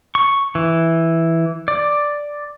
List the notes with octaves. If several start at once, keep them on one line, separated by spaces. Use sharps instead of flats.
C#6
E3
D5